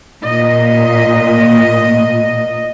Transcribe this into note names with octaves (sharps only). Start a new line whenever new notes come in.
A#2 D#5